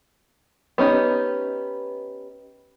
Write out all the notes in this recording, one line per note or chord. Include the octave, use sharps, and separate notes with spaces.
B3 C#4 D#4 G4